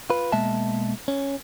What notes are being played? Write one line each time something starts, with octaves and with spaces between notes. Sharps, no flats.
F4 B4
B2 G#3 A#3 E5 A5
C#4